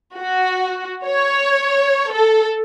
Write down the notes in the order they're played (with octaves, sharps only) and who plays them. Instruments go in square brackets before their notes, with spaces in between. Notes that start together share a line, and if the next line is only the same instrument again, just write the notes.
[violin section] F#4
C#5
A4